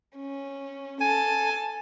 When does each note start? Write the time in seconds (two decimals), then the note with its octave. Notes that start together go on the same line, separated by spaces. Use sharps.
0.16 C#4
1.01 A4 G#5 A5